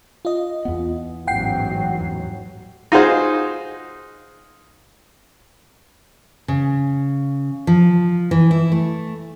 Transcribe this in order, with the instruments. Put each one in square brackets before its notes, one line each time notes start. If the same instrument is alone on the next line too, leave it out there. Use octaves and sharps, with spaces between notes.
[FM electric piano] F4 D#5
[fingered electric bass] E2 B3
[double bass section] A1 G#2 F#3 [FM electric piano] F#5 G5 C7
[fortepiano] D#4 F4 F#4 G#4 C5
[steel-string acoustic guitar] C#3
F3
E3
E4
A3